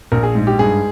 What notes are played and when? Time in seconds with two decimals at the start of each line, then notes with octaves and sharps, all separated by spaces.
0.12 A#1 A#4
0.23 G#4
0.35 G#2
0.47 G4
0.59 G2 G#4